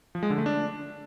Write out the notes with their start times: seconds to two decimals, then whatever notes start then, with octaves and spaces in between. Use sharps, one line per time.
0.15 F3
0.23 G#3
0.30 D3
0.38 A3
0.46 D4